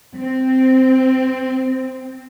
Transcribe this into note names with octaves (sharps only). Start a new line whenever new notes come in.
C4